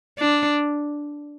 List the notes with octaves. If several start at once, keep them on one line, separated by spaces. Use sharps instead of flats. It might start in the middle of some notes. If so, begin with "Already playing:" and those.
D4